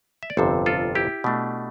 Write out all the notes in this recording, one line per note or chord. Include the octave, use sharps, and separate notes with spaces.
E5
D5
G1 F2 C3 A4 C5
F4 A4
E4 G4
B2 A3 D4